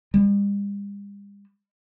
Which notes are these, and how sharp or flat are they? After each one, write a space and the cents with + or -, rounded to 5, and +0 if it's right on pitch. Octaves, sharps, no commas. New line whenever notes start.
G3 +45